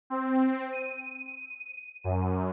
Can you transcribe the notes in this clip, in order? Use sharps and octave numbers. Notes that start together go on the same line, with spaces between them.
C4
D#7
F#2